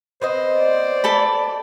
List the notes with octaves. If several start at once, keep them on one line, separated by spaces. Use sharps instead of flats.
B3 C4 C5 D#5
D5
A4 A5 B5